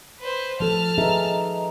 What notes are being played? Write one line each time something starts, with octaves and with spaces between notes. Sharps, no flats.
B4 C5
F3 A4 A5 F6
D#4 G#4 B4 D#5 E5 A#5